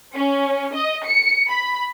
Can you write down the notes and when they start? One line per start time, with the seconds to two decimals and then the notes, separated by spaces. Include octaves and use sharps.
0.15 C#4
0.75 D#5
1.06 C#7
1.49 B5